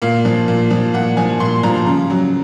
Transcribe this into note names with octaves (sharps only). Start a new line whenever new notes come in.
A#2 F5
F3
A#2
F3
A#2 F#5
F3 G#5
A#2 C6
F3 A#5
C#3
F#3